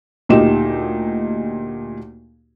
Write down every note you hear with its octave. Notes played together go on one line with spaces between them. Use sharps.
D2 A#2 D#4 G4 E7